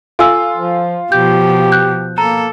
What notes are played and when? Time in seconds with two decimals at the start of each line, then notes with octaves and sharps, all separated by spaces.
0.19 F4 A4 G#5 E6
0.57 F3
1.12 B2 F3 G4 G6
1.72 F#6 G6
2.18 A#3 A4 A#5